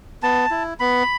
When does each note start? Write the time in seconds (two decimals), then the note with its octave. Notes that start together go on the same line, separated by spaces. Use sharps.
0.23 B3 A5
0.51 E4
0.80 B3 B5